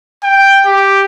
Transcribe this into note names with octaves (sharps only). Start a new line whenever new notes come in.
G5
G4